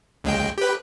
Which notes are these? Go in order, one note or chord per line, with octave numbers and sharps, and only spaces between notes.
C#2 G#3 G5
G4 B4